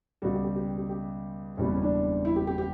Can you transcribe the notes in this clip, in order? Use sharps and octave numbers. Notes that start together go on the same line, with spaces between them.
C#2 B2 G3 F#4
G4
G4
G4
G4
G4
F#1 E2 B2 G3 C#4
B3
C#4
D4
E4
G4
G4
G4